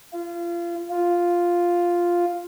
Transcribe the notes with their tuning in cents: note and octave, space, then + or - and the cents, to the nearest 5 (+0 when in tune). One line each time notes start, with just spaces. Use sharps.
F4 -30
F4 +0